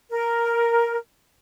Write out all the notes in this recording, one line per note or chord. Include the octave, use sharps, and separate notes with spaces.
A#4